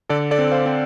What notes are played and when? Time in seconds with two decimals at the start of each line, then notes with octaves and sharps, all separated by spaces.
0.09 D3 A4 D5
0.31 A4 D5
0.39 C4
0.52 C5 F5
0.66 C4